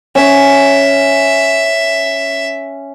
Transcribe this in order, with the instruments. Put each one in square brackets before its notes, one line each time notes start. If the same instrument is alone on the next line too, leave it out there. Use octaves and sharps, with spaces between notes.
[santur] C#4 [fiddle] E5